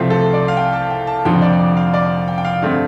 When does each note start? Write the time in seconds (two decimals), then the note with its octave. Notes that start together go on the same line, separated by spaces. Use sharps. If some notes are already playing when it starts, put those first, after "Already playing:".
Already playing: C2 C3 F3 A3 C4 F4
0.10 A4
0.33 D5
0.48 F5
0.57 G5
0.73 A5
0.90 G5
1.07 A5
1.25 F1 F2 D3 F3 G5
1.42 D5
1.59 D5
1.77 F5
1.94 D5
2.28 G5
2.38 G5
2.45 F5
2.62 G2 D3 A3 C4 F5